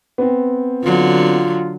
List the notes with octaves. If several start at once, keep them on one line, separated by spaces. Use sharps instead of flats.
B3 C4
D3 F#3 F4